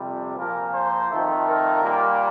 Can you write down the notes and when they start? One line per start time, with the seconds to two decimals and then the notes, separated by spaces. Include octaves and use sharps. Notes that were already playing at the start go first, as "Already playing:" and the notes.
Already playing: F2 C3 G3
0.35 A#2 F3 A#3 A#4
0.72 C5
1.09 F2 D#3 A3
1.45 A#4
1.82 A#2 G3 A#3